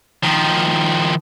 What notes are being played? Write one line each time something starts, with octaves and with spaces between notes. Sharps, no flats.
D#3 F3